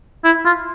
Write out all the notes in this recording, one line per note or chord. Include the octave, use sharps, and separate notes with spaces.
E4
F4